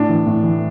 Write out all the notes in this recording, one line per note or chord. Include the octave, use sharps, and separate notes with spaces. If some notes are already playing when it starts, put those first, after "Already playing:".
Already playing: A2 D4
E3
A2
E3